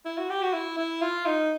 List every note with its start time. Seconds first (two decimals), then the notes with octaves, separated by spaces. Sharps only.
0.05 E4
0.18 F#4
0.30 G4
0.42 F#4
0.53 E4
0.78 E4
1.02 F4
1.26 D#4